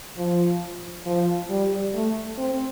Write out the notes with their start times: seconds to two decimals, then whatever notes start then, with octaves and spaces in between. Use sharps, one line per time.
0.17 F3
1.06 F3
1.49 G3
1.94 A3
2.38 C4